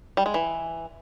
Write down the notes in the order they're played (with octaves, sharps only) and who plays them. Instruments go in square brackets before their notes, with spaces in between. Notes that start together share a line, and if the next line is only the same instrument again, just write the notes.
[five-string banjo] G3
G#3
E3